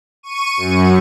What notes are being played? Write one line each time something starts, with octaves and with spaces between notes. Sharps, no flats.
C#6 D#7
F#2